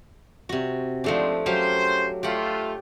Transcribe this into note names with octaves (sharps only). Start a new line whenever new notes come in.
C3 F#4
G#2 F3 A3 C4 D4
F#2 F#3 C#4 G4 C5 F5
A3 F4 G4 F#5